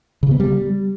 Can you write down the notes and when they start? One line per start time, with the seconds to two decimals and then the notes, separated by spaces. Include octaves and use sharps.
0.23 C#3
0.31 B3
0.40 G3